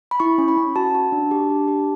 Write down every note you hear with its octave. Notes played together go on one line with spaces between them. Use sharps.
B5
E4 C#6
C#4
B5
C#4
F#4 A5
F#4
D4
G4
D4
G4